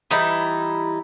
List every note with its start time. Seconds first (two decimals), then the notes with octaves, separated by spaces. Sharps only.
0.11 E3 G3 D#4 E4